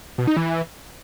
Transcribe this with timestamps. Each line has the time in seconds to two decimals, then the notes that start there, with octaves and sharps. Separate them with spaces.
0.18 B2
0.27 D#4
0.37 E3